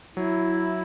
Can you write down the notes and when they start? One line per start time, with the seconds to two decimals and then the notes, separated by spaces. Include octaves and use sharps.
0.16 F#3 E4